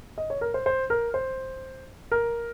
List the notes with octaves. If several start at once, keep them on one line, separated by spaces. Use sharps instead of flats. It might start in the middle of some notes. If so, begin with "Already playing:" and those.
D#5
C#5
A#4
C5
C5
A#4
C5
A#4